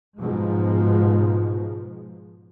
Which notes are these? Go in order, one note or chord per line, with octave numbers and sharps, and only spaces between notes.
G#2 B2 F3 G#3